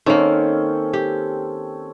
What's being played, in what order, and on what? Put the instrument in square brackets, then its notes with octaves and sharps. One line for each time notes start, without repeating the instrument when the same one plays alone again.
[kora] D#3 A#3 [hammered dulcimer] C4 C#4 A4
[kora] G4